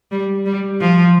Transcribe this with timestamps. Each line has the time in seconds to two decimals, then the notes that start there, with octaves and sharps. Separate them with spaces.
0.12 G3
0.46 G3
0.81 F3